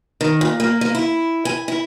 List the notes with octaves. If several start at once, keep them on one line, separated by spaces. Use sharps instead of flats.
D#3
A#2
A#3
A#3
E4
G#5
E4